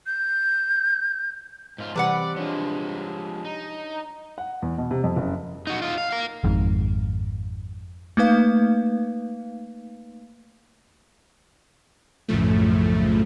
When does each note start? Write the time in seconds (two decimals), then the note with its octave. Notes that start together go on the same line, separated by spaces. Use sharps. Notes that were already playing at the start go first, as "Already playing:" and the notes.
0.07 G6
1.78 G#2 F4
1.96 C3 E3 G3 B4 D5 F#5
2.36 F3 G#3 D4 C#5
3.45 D#4
4.38 F#5
4.62 E2
4.78 B2
4.91 C3
5.04 F2
5.16 F#1
5.67 D#4 F#4
5.82 D#4 F4
5.98 F5
6.11 A#4 F5
6.44 G#1 F2 G#2
8.17 A3 A#3 D#4 B4 F5
12.28 B1 F#2 A2 C#3 F3 A3